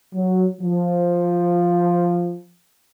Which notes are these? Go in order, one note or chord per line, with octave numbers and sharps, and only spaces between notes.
F#3
F3